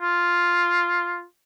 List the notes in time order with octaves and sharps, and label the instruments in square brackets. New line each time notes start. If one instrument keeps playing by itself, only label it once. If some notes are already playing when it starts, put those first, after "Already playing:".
[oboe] F4